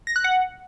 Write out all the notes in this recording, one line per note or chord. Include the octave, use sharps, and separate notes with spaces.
A#6
F#6
F#5